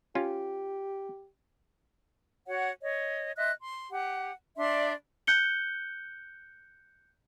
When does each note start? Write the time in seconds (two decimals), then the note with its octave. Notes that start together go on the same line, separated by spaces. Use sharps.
0.15 C#4 F4 G4
2.47 F#4 C#5 F#5
2.82 C#5 D#5
3.37 D#5 E5 C6 F#6
3.60 C6
3.90 G4 F#5
4.57 D4 D5 E5 C6
5.27 F#6 G6 C#7 G7